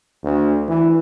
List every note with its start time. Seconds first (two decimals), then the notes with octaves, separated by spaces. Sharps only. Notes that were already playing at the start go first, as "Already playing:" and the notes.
0.24 D2
0.68 E3